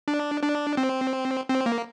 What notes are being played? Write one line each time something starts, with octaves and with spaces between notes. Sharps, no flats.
D4
D4
C4
C4
A#3